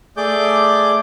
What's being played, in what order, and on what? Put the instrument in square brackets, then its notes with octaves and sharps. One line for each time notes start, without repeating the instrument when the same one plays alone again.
[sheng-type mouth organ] A3 G#4 D5 D6 G6